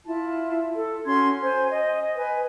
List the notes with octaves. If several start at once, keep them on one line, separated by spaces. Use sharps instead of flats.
E4 F4 A5
A4
C#4 F#4 C6 G#6
C5 G#5
D#5
B4 G#5